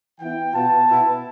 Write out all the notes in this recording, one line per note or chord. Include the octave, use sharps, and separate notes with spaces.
E3 B3 E4 G5
B2 B3 F4 A5
B2 B3 E4